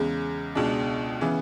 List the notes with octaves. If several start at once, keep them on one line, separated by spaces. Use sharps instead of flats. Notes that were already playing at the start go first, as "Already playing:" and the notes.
Already playing: E2 C#3 G#3
C#2 B2 G#3 D4
C#3 E3 B3